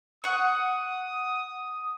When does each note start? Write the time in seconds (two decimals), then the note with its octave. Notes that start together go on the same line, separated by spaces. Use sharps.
0.24 F#5 C#6 D#6